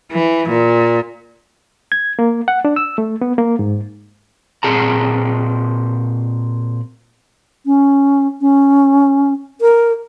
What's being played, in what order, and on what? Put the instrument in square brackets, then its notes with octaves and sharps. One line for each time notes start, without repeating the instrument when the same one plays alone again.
[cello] E3
A#2
[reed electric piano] G#6
A#3
F#5
D4
E6
A3
B3
A#3
G#2
[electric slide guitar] A#2 C4 G#4 A5 A#5
[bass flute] C#4
C#4
A#4